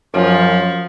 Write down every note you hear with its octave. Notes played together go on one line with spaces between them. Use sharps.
F#2 F3